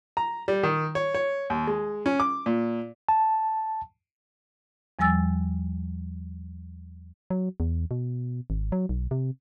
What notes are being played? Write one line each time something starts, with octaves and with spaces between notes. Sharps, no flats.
A#5
G3
D#3
C#5
C#5
D#2
G#3
C#4
D6
A#2
A5
E2 F3 G3 G#5 E6 A6
F#3
E2
B2
G#1
F#3
B1
C3